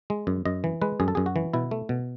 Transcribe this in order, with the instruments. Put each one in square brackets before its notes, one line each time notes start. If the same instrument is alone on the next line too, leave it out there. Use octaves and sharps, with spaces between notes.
[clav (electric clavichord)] G#3
F#2
F#2 D#5
E3
G#3 B4
F#2 G#4
A4
F#2 G#4
F#4
E3
B2 E4
A3
B2